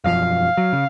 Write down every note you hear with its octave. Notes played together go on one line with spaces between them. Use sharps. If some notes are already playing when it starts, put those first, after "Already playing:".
E1 F#2 F3 F5
F#3
C#3